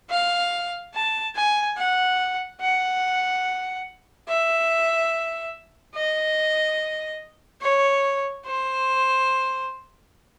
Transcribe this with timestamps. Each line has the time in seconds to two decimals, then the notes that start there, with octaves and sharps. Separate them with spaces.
0.10 F5
0.94 A5
1.35 G#5
1.78 F#5
2.61 F#5
4.28 E5
5.95 D#5
7.62 C#5
8.46 C5